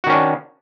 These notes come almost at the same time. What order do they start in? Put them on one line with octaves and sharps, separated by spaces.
F#4 D#3 C#4 D4